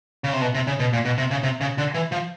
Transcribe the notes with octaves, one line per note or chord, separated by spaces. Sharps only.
C#3
C3
B2
C3
C#3
B2
A#2
B2
C3
C#3
C3
C#3
D3
E3
F3